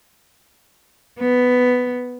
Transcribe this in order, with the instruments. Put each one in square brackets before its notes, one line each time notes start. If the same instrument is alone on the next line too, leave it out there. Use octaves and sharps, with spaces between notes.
[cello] B3